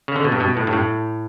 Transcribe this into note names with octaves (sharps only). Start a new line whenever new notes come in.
C#3
D3
B2
G2
B2
A2
G2
A2